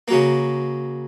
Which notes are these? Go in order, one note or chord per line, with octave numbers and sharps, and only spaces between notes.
C#3 F#3 A#3